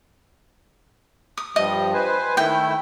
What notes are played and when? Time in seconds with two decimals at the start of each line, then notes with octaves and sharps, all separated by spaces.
1.38 D#6
1.56 G2 F3 G3 D#5
1.94 B4 C5 G#5
2.37 D#3 A3 E4 G5